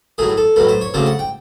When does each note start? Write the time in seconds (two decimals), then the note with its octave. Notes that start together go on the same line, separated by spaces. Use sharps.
0.18 A2 F#3 A3 G#4
0.37 A4
0.56 A2 F#3 A3 B4
0.69 C5
0.81 C#5
0.94 C#3 F#3 A3 D4 C5
1.06 F#5
1.19 G5